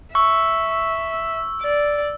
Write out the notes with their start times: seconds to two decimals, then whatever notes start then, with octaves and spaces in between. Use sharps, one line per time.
0.15 E5 C#6 E6
1.62 D5